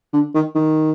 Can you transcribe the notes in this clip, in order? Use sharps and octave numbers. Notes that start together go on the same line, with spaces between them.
D3
D#3
D#3